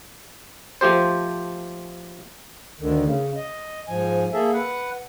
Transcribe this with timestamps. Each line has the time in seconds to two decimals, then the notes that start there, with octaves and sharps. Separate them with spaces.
0.81 F3 A3 G4 C5
2.80 D2 D3 D#3
3.04 C#3
3.36 D#5
3.88 G#2 F3 G#5
4.33 A#3 G#4 A4 E5
4.53 B4 F#5